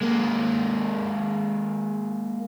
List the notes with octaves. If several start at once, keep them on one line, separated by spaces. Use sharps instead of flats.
G#3 A#3